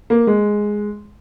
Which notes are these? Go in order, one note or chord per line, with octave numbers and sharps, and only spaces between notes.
A#3
G#3